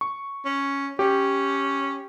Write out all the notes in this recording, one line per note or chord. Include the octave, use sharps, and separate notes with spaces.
C#6
C#4
C#4 G4